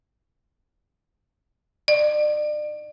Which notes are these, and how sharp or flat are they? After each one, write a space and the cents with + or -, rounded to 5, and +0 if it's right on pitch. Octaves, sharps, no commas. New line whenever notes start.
D5 +35